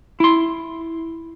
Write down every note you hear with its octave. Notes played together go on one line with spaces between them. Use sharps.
E4 C6